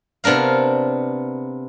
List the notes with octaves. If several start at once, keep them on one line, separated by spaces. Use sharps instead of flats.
C3 B3 D4 A#4 F5